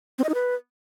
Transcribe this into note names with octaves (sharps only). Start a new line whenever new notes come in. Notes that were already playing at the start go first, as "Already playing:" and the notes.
C4
D#5
D#4
B4